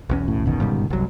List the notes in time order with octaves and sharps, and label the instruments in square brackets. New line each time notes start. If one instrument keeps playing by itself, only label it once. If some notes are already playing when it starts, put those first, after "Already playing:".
[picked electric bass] B1 E2 C#4
[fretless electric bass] A2
G1 B2 D#3
[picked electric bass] G#2 C#3 G3
[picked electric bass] G1 F#3 [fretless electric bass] C2